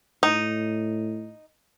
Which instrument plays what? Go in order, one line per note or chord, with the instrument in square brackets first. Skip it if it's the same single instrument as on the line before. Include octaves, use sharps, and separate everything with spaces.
[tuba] A2 [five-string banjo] D#4